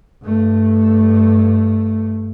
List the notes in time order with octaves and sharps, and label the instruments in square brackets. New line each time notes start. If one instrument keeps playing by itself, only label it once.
[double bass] G2 A3